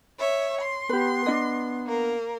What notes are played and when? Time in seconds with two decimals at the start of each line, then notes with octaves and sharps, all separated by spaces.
0.19 C#5 E5
0.60 C6
0.89 B3 G4 B4
1.26 D4 D#4 D#5
1.86 A#3 A#4